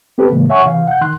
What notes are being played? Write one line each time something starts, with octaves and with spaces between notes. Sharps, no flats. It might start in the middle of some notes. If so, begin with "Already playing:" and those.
B3 C4 G4 A4 B4
A2 C#3 E3 G#3 A#3
C#5 E5 F#5 G#5 C#6
C3 E3 F5
F#5 G6
D#3 C6 F#6